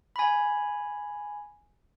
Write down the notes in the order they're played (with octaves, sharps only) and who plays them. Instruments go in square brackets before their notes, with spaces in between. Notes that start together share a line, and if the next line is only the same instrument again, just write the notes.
[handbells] G#5 B5